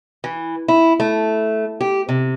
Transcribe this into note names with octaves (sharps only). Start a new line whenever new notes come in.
E3
E4
A3
G4
C3